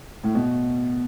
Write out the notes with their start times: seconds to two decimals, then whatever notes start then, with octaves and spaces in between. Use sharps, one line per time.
0.24 A2
0.35 B2